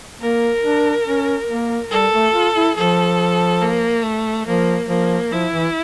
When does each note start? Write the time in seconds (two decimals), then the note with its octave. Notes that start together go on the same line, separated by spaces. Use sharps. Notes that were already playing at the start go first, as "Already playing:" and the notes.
0.21 A#3 A#4
0.64 D4
1.06 C#4
1.49 A#3
1.92 G3 A4
2.13 A3
2.34 F4
2.56 E4
2.76 F3 A4
3.61 A#3
4.04 A3
4.47 F3 A#3
4.88 F3 A#3
5.31 F3 E4
5.53 E3